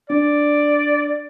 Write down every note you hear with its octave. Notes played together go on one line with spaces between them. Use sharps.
D4 D5